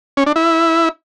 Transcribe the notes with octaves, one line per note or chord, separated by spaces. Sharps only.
C#4
D4
E4